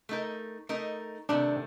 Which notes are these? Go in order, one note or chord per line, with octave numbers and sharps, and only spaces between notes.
A3 D#4 A#4
A3 D#4 A#4
C3 D#3 A3 D4